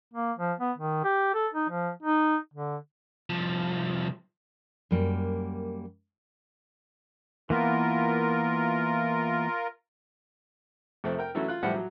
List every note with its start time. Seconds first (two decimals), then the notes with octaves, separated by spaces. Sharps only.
0.14 A#3
0.39 F3
0.60 B3
0.78 D#3
1.04 G4
1.34 A4
1.54 D#4
1.69 F3
2.03 D#4
2.54 D3
3.30 C2 F3
4.91 F#2 G3 A#3
7.50 E3 A#3 B3 F4 A#4
11.04 F2 C3 A3 C4
11.18 A#4 G5
11.35 E3 F#3 A3 C#4 E4 F#4
11.48 F4 F#6
11.63 A2 E3 F3 G3 F#5
11.74 F#3